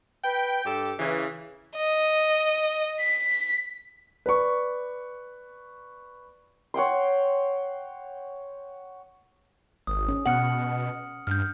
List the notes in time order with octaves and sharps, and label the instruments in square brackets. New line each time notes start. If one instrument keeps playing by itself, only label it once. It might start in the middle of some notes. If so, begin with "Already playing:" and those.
[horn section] B4 G5
G2 G4 A4
C#3 E3
[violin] D#5
B6
[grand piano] B4 D5 C#6
[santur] C#5 F#5 G5 C6
[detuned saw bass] G#1 [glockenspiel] D#6
[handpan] C#4
[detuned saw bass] B2 [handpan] F#5 [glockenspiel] F6 C#7 F#7
[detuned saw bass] G2 [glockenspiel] F6 G6